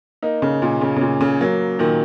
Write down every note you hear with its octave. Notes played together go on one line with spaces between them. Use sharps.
A#3 D#4
C#3
A#2
C#3
C#3
A#2
C#3
F#3 A#3
A#2 D#3